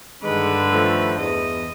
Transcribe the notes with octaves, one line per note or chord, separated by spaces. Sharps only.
G2 D3 D#3 G#3 B4
D#3 F3 A3
E2 D#5